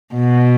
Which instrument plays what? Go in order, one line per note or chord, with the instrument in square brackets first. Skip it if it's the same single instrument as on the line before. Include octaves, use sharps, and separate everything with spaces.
[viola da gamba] B2